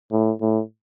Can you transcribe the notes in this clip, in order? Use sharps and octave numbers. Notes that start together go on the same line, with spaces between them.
A2
A2